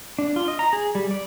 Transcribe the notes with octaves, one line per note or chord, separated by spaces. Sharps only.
D4
F4
D#5
A#5
G#4
G3
D5